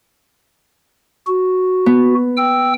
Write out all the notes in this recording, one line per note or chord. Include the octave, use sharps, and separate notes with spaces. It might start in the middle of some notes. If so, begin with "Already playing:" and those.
F#4
B3
G5 E6